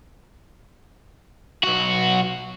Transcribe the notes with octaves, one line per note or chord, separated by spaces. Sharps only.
B1 F#4